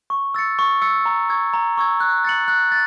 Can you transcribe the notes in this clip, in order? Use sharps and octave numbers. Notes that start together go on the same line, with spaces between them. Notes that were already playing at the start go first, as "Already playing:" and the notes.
C#6
E6 A6 C#7
C#6
E6 A6 C#7
A#5
C#6 E6 G#6
A#5
C#6 E6 G#6
F#6
A6 C#7 F#7
F#6
A6